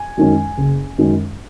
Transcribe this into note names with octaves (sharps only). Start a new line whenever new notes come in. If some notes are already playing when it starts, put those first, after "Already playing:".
Already playing: G#5
F#2 D#3 G#3 C#4
F#1
F#2 D#3 G#3 C#4